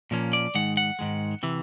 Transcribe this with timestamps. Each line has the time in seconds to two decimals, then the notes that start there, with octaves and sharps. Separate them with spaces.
0.11 A#2 F3 A#3 C#4
0.33 D5
0.55 G#2 D#3 G#3 F#5
0.77 F#5
0.99 G#2 D#3 G#3
1.43 C3 E3